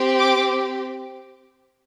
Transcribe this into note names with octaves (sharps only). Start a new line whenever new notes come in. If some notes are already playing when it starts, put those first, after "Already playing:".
Already playing: C4 G4
D6